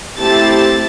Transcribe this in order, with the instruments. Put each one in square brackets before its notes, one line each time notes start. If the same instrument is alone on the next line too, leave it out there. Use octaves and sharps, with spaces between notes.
[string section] A3 C4 E4 G4 A5 A6